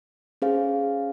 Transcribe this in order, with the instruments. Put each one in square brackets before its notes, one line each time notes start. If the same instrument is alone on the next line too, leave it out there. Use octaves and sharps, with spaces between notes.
[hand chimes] C#4 G#4 C5 F5